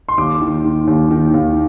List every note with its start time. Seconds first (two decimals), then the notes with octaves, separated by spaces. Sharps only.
0.09 C6
0.18 D#2 D6
0.41 D#3
0.65 D#3
0.87 D#2
1.11 D#3
1.34 D#2